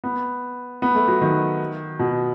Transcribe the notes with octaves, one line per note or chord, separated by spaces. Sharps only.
B3
B3
A3
F#3
D#3
B2